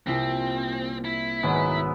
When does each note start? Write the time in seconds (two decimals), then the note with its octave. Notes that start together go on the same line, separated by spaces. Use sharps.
0.07 C2 A#2 C4 E4 A#6
1.05 E4
1.43 G#1 F#3 G#3 B3
1.77 E5